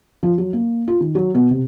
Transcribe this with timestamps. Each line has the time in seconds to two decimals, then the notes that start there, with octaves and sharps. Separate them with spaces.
0.23 F3
0.38 F#3
0.53 A#3
0.88 F4
1.00 D#3
1.15 F#3
1.35 B2
1.51 C3